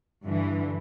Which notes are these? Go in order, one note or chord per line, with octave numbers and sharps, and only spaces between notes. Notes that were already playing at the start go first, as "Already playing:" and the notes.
G2 D3 E3